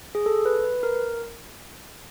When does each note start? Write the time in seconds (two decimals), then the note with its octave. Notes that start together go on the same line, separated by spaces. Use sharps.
0.15 G#4
0.26 A4
0.45 B4
0.64 B4
0.83 A#4